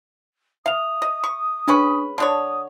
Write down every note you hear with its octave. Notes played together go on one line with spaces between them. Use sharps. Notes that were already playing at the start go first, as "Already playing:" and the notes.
E5 F5 D#6 F7
D#5
C#6
G#3 C#4 D4 B4 C#6
D3 D4 C#5 A5 D#6